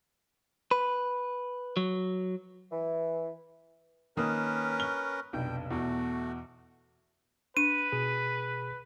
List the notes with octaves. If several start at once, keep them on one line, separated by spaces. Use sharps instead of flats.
B4
F#3
E3
D#3 A#3 C#4 A#4 B4 D#6
C#6 G7
F1 B1 D4 G5
E2 B2 A3 F#4
D4 B4 D#7
B2 G#4